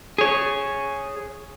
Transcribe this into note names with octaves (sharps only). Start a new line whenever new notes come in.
G#4 C#5